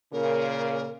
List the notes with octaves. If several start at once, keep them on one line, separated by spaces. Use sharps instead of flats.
A#2 C#3 A#3 A#4